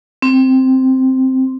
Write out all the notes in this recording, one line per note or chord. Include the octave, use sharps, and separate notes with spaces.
C4